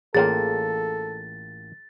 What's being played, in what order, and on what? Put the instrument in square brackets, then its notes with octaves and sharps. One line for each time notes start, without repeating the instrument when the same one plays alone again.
[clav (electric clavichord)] A1 A#3 F4 [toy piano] G#4 C#5 G5 [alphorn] A4 [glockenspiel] A6